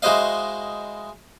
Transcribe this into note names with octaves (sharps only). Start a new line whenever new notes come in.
G#3 E4 F#4 C5 D#5 F5